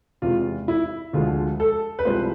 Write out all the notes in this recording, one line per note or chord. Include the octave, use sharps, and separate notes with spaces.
E2 C3 G#3 F4
E4
D2 D3 F3 G#3 F4
A4
B4
C2 C3 F3 G#3 C5